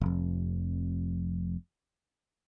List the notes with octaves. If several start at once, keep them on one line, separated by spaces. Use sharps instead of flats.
F1 F2